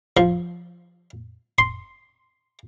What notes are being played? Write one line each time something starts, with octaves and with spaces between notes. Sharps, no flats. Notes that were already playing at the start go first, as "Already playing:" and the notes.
F3
C6